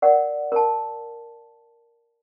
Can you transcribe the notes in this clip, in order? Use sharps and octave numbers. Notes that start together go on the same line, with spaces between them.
A#4 D5 F#5
A#4 A5